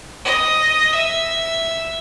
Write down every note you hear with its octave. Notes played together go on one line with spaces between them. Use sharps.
D#5
E5